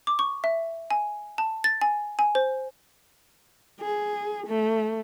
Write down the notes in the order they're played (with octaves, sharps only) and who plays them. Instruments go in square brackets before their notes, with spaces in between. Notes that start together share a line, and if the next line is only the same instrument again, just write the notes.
[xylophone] D6
C#6
E5
G#5
A5
A6
G#5
G#5
C5
[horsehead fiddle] G#4
A3